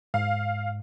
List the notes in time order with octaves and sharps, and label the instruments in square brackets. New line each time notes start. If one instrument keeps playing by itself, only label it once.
[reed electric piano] G#2 [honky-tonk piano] F5